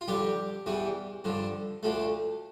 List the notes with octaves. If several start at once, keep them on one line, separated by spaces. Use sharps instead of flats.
F4
F2 D3 G3 G4
E2 E3 G3
G2 D3 F3
D2 D3 F3 A3